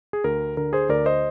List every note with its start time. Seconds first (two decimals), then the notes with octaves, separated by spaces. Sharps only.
0.13 G#4
0.24 D2 A#4
0.57 D3 A#4
0.73 G#4 C5
0.89 D2 A#4 D5
1.06 C5 D#5